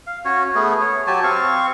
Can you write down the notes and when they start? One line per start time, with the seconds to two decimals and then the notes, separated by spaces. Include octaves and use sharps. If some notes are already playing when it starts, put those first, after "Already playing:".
0.07 F5
0.25 C#4 F#4 C#5
0.55 A3 B3 G#4
0.81 C#5
1.07 F#3 G4 G#5 A5
1.23 C4 F5 C#6